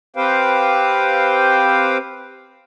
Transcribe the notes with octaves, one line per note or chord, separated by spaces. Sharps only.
C4 G4 B4 C5 F5 G5